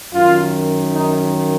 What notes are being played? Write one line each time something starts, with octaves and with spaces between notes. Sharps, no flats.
F#2 D#3 F4
D#4